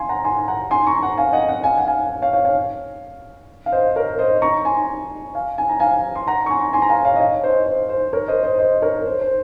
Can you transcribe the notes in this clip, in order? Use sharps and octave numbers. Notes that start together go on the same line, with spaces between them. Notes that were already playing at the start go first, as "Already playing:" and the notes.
Already playing: F5 G#5 C6
F#5 A#5
G#5 C6
F#5 A#5
G#5 C6
A#5 C#6
F#5 A#5
F5 G#5
D#5 F#5
D#5 F#5
F5 G#5
F#5
F5 G#5
C#5 F5
C#5 F5
C#5 F5
F5
C5 D#5
A#4 C#5
C5 D#5
A#5 C#6
G#5 C6
F5 G#5
G#5
A#5
F5 G#5
C6
F#5 A#5
C#6
G#5 C6
G#5 C6
A#5
F5 G#5
C#5 F5
D#5
C#5 F5
C5 D#5
C5
C5
A#4 C#5
C5 D#5
C5 D#5
C5 D#5
A#4 C#5
C5
C5